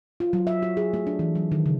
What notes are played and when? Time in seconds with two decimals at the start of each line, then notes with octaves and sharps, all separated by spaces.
0.20 F4
0.33 F#3
0.47 E5
0.62 F#4
0.77 G#4
0.93 A3
1.07 D4
1.19 E3
1.36 F#3
1.52 D#3
1.66 C#3